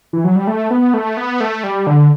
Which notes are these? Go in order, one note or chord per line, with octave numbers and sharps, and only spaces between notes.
E3
F#3
G3
A3
B3
A3
B3
A3
G3
D3